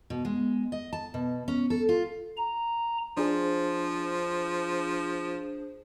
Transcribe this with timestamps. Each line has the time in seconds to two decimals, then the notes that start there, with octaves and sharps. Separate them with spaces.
0.10 B2
0.25 G#3
0.72 D#5
0.93 A5
1.14 B2
1.48 C#4
1.70 A4
1.89 F4
2.37 A#5
3.17 F3 D4 G#4 C5